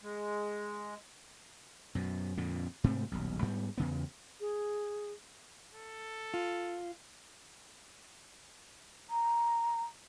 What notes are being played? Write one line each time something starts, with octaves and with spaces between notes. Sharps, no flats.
G#3
F#2 B2
F2 A#2 D3
G#2 C3 A3 C4
D#1 B1
G#2 G3 B3
E2 C#3 B3
G#4
A4
F4
A#5